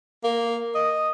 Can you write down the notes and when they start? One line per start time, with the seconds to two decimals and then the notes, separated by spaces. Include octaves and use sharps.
0.24 A#3
0.75 D#5